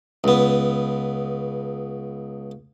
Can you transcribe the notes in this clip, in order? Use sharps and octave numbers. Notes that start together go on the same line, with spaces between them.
C#2 B3